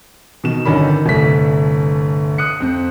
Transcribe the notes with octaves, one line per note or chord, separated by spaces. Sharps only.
B2 D#3 E7
G1 D3 D#3 C#4 D4 B5
G1 C2 A3 B6
D#6 F#6 C#7
F2 C4